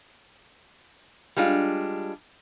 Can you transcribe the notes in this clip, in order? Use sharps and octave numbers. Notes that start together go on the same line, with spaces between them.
G3 G#3 D4 F4